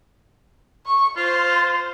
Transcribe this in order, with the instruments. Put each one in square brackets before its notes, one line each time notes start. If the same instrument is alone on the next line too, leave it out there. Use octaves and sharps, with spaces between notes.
[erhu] C#6
[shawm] F4 [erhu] C5